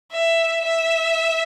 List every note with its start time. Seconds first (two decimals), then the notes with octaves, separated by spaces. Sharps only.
0.12 E5
0.64 E5